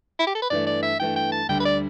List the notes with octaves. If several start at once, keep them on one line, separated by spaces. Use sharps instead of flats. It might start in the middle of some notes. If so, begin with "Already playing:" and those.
E4
G4
A4
B4
G2 E3 A3 D5
D5
E5
G2 E3 A3 G5
G5
A5
D2 D3 G3 D4 G5
B4
D5